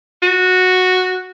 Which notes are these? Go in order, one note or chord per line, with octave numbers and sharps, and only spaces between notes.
F#4